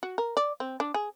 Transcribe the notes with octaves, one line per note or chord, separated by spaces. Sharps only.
F#4
A#4
D5
C4
D4
G#4